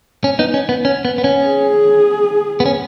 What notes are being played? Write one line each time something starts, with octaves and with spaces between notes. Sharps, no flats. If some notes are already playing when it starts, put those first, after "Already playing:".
C#4
B3 D#4
C#4
B3
C#4
B3
B3
C#4
G#4
B3
C#4